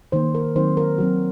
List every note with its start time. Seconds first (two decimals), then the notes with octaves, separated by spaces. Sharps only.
0.12 D#3 A#3 C5
0.35 A#4
0.56 D#3 F#3 C4 C5
0.77 A#4
0.98 D#3 F#3 C4 F#4